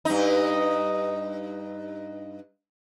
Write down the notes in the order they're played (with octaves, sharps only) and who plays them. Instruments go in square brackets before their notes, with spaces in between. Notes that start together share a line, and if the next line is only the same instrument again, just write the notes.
[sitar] G2 D#4